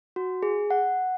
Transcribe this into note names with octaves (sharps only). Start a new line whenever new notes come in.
F#4
G#4
F#5